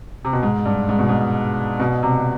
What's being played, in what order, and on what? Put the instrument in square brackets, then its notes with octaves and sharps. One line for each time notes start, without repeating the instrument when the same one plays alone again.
[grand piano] C3
B2
G#2
G2
G#2
B2
G#2
B2
C3